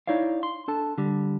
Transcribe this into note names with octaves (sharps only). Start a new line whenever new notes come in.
D#4 E4 C#5 D5 F5
C6
D4 A4 A5
D3 G3